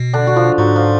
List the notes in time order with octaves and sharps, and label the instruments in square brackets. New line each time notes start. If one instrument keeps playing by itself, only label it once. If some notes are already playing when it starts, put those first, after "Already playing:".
Already playing: [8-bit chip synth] B2
[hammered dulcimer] D3 D4
F#4
F3 F4
[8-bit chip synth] G#2 [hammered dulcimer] F#3 F#4
[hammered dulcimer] F3 F4